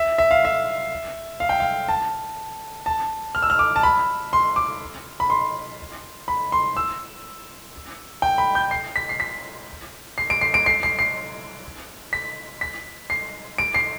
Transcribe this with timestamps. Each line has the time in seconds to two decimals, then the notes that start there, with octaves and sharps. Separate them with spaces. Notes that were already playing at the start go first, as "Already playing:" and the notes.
Already playing: E5
0.18 E5
0.31 F5
0.45 E5
1.40 F5
1.49 G5
1.60 F5
1.89 A5
2.86 A5
3.35 F6
3.43 E6
3.50 F6
3.59 D6
3.76 A5
3.83 B5
4.33 C6
4.56 D6
5.20 B5
5.30 C6
6.28 B5
6.52 C6
6.77 E6
8.22 G5
8.38 B5
8.55 G6
8.71 C7
8.96 B6
9.09 C7
9.20 B6
10.18 C7
10.30 D7
10.41 C7
10.54 D7
10.66 C7
10.83 C7
10.99 C7
12.13 B6
12.61 B6
13.10 C7
13.58 D7
13.74 C7